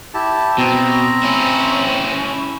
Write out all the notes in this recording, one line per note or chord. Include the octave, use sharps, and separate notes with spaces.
E4 G4 A5
B2 C4 A#5
C#4 E4